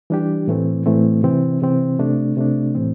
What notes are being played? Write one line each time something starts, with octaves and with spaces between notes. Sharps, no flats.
E3 G3 D4 G4
A2 E3 A3 C4
A2 E3 A3 C4
C3 E3 C4
C3 E3 C4
C3 A3 D4
C3 A3 D4
A2 E3 C4